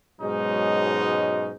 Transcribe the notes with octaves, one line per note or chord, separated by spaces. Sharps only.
G#2 B2 F#3 G#3 C#4 D#4